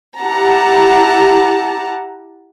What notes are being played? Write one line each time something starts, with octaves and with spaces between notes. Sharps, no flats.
E4 G4 F#5 A5 A#5